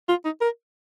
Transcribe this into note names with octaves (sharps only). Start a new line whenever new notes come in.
F4
D#4
A#4